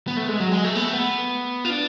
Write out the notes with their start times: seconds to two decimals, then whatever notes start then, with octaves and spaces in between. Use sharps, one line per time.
0.08 B3
0.17 A3
0.28 G#3
0.40 F#3
0.52 G#3
0.64 A3
0.75 B3
0.84 A3
0.93 B3
1.65 F4
1.70 D4